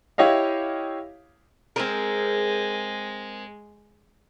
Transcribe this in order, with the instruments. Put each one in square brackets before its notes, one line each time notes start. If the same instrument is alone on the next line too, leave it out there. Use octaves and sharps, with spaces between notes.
[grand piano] E4 G4 C#5 D#5 F5
[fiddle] G#3 [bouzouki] C4 G#4 A#4